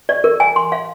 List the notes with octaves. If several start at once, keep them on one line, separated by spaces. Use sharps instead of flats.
D5
A#4
G#5
C6
F5